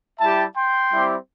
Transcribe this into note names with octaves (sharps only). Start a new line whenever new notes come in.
G3 E4 G4 E5 A5
G5 C6
G3 C4 E4 G4